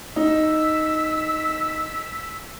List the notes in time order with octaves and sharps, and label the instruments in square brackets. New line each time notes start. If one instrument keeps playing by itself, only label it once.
[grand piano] D#4 [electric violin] E6 B6